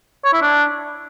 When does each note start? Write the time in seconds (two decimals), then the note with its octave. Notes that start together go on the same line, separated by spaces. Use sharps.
0.25 C#5
0.33 E4
0.42 D4